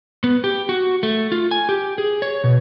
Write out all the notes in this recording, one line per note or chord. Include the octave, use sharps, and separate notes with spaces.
B3
G4
F#4
A3
F4
G#5
G4
G#4
C#5
B2